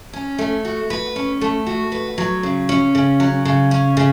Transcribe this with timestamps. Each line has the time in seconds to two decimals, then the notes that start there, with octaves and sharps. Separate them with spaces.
0.13 C#4
0.38 A3
0.65 F#4
0.90 B4
1.16 C#4
1.41 A3
1.67 F#4
1.92 B4
2.18 F#3
2.43 C#3
2.69 C#4
2.95 C#3
3.20 F#3
3.45 C#3
3.71 C#4
3.97 C#3